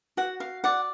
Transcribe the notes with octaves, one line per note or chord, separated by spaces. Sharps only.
F#4 F#5
F5
D5 F#5